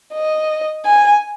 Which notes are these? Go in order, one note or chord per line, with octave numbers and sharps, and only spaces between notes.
D#5
G#5